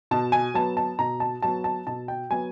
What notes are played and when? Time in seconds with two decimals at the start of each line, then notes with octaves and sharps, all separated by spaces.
0.11 B2 A5
0.32 G#5
0.54 F#3 B3 A5
0.77 A5
0.99 B2 A#5
1.20 A5
1.42 F#3 B3 A5
1.64 A5
1.87 B2 A5
2.08 G5
2.30 F#3 B3 G#5